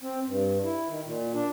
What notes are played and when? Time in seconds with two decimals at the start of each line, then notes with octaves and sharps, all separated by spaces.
0.02 C4
0.26 G2
0.64 E4
0.89 D#3
1.05 A#2
1.34 D4